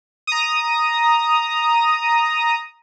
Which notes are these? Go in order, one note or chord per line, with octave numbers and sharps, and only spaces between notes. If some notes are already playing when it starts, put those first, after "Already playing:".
A#5 D#6